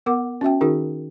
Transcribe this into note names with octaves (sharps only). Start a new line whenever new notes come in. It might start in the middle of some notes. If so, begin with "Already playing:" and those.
B3 A#4 F#5 D6
C#4 F#4 E5 G5
D#3 C#4 D#4 F#4 G#4 A#4